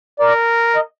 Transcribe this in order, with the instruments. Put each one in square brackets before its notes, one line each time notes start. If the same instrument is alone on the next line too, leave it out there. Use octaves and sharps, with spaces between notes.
[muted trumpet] A#4 [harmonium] D5
[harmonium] D#5